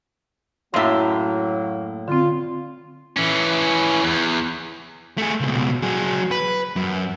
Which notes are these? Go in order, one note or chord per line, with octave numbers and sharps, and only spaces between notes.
F#2 A2 F#3 A#3 E5 F5 C6
D3 C4 F4
E3 C#4
E2
A3 G#4
C#2 B2
F#3 G#4
B4
F#2